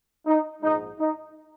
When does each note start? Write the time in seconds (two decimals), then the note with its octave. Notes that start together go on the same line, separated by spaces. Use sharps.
0.26 D#4
0.62 A#1 G#2 G#3 D#4
0.99 D#4